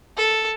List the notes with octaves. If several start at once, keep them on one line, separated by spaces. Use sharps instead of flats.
A4